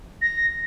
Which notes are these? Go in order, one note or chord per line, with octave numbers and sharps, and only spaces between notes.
A#6